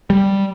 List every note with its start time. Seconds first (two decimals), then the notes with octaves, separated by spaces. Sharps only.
0.10 G3